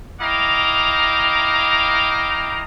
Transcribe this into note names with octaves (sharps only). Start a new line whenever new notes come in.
E4 D#5 F5 G5 A#5 D6